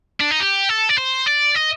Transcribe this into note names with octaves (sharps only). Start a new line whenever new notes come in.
D4
D#4
G4
A4
D5
C5
D5
D#5